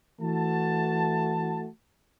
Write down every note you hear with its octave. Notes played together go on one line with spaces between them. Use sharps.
E3 A3 F#4 A5